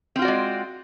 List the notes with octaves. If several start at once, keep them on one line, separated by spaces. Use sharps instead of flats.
G#3 C4 F4 F#4 D5